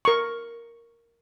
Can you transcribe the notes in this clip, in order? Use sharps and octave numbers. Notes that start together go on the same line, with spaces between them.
A#4 C#6